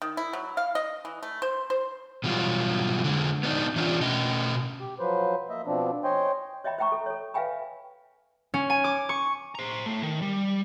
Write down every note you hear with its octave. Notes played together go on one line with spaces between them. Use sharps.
D#3
E4
F#3
F5
D#5
E3
A3
C5
C5
B2 E3 F#3 G3 F4
D3 G#3
B3 D4 D#4
E3 C#4 D4 F4
B2 C#4 D#5
G4
F3 F#3 B4 C5
A#3 D#5 E5
B2 F3 C4 D4
C5 C#5 D#5 G5 G#5 C6
C#5 D#5 E5 G5 B5
C5 E5 G5 A#5 C#6
A4
A4 C#5
B4 E5 F5 G5 G#5 B5
C#4
G#5
D6
C#6
C5 A#5
A2 A3
D#3
G3